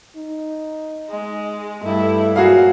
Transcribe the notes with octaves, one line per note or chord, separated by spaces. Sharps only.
D#4
G#3
G2 A3 E4
A#2 F#3 F#4 G#4 F5